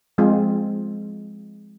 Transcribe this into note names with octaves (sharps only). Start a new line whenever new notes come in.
F3 G#3 C4 F4